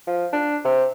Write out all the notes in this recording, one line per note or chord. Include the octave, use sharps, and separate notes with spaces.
F3
D4
C3